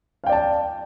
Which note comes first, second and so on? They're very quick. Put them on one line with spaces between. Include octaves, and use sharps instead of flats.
F5 G5 D5 A5